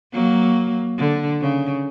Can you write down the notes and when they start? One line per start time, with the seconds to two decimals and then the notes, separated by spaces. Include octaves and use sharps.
0.13 F#3 A#3
0.98 D3
1.41 C#3